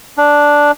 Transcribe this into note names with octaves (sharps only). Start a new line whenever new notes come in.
D4